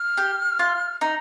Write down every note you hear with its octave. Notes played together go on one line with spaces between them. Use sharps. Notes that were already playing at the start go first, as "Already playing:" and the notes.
Already playing: F6
G4
F4
D#4